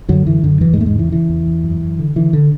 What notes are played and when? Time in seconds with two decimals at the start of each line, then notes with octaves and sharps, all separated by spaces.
0.09 F#2 D3 F#3
0.26 F#2 E3
0.43 F#2 D3
0.61 E2 E3
0.73 G#2 G#3
0.78 E2 A3
0.86 G#2 G#3
0.96 C#3 E3
1.12 C#3 E3
1.29 E2
1.47 E2
1.64 F#2
1.81 F#2
1.99 D3
2.16 D3 E3
2.33 D3